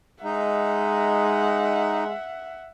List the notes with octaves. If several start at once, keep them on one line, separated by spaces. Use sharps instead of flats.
G#3 D#4 E5 F#5